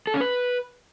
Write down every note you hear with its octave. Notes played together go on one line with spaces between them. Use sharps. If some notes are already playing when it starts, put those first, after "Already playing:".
A4
C#4
B4